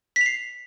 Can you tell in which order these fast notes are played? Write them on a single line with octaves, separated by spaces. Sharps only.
B6 F7 C7